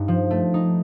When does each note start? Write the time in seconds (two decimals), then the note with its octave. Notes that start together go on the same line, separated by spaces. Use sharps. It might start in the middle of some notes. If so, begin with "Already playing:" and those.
Already playing: G2 D#4
0.08 F3
0.31 A3
0.54 D#4